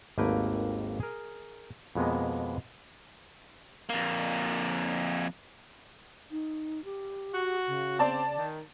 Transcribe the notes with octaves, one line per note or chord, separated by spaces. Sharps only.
G#1 D#2 A3 A#3 B4 G5
G#4 A#4
F2 B2 G#3 A#3 B3
F2 A#3
D#4
G4
F#4
C#3
C4 D5 A5
D#3